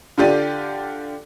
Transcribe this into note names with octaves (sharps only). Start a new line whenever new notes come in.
D3 F4 G4 D5 D#7